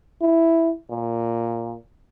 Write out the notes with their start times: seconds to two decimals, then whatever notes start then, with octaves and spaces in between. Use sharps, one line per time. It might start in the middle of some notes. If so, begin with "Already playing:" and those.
0.22 E4
0.90 A#2